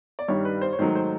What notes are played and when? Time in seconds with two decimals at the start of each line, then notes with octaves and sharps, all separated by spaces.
0.19 D5
0.28 G2 D#3 G3 C#5
0.45 B4
0.62 C5
0.73 C#5
0.79 G#2 D#3 F#3 A3 C5
0.96 C5